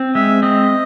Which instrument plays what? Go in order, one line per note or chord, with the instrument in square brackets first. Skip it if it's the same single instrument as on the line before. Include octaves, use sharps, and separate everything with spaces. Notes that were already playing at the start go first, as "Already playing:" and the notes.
Already playing: [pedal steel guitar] C4
[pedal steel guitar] G#3 [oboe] E5
[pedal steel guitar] C4 [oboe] D#5